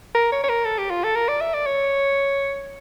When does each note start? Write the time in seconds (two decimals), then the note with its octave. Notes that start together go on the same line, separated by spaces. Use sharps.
0.15 A#4
0.32 C#5
0.44 C#5
0.49 A#4
0.65 A4
0.78 G4
0.90 F4
1.04 A4
1.16 A#4
1.29 D5
1.41 E5
1.54 D5
1.66 C#5